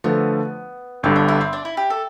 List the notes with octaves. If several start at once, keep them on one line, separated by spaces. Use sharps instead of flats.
D3 F3 A3 B3
G1 G2 D3 G3 C4
D4
E4
C4
D4
E4
G4
A4